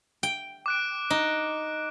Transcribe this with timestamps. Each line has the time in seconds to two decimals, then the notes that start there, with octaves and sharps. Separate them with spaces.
0.23 G5
0.66 D6 F#6 D7
1.10 D#4